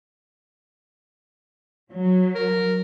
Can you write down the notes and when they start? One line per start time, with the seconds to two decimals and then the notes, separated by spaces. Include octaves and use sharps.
1.92 F#3
2.35 A#4